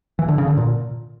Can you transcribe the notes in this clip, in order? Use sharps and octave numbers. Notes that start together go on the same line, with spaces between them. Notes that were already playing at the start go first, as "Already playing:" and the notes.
E3
D3
C#3
D3
A#2